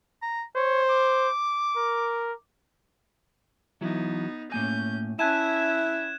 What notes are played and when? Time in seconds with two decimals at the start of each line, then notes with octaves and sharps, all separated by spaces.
0.22 A#5
0.56 C5 C#5
0.89 D6
1.77 A#4
3.81 E3 F#3 B3 D#4 E4
4.52 A2 A#3 C#4 G#5 G6
5.19 C#4 E4 E5 G#5 A5 F#6 G#6 E7